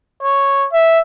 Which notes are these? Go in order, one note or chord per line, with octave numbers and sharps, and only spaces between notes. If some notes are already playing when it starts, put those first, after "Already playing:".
C#5
E5